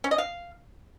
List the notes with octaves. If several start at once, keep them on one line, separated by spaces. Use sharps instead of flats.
C#4
D#5
F5